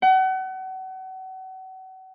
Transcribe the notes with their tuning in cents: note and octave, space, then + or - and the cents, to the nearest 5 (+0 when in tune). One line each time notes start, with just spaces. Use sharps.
F#5 +35